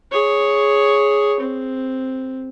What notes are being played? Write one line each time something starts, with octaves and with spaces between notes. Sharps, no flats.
G#4 C#5
C4